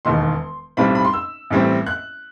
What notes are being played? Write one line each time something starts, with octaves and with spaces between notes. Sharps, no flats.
E1 D#2 D#3 C6
B1 A2 G3 C4 B5
B5
C6
E6
A1 A2 G3 C4
F#6